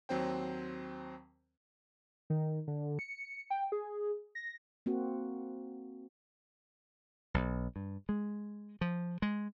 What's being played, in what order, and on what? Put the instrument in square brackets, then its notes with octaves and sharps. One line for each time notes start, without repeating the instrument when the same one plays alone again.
[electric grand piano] D#2 F#3 C4 C5 G5
[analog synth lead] D#3
D3
C#7
G5
G#4
A#6
[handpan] A#3 C4 F#4
[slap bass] B1
G2
G#3
F3
G#3